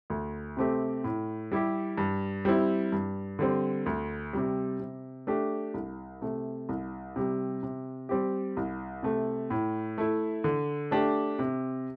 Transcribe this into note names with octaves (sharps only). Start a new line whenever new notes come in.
D2
C3 A3 C4 G4
A2
G3 E4 G4
G2
G3 C4 E4
G2
D3 G3 C4
D2
C3 G3
C3
A3 D4 G4
C2
C3 A3
C2
C3 G3
C3
G3 C4 G4
C2
C3 A3
A2
A3 E4
D3
A3 D4 G4
C3